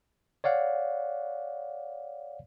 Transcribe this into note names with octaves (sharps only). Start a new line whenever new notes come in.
C#5 D5 F5 F#5